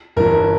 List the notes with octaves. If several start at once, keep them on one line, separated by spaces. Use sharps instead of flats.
G1 G2 E3 A#4